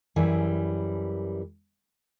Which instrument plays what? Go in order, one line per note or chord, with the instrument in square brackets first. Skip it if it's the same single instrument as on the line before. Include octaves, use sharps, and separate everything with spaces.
[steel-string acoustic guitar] F#2 E3 G3 G#4